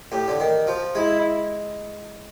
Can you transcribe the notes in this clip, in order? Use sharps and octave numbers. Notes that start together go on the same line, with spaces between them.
A2 G4
D3
D#3
F3
G#3 E4